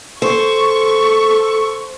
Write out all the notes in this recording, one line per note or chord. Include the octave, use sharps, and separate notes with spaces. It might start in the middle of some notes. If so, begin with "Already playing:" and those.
A4 C5 C#6